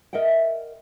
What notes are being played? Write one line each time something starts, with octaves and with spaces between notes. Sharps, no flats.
A#4 D#5 E5 F#5 G5